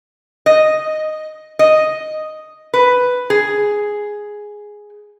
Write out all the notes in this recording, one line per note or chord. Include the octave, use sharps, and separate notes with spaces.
D#5
D#5
B4
G#4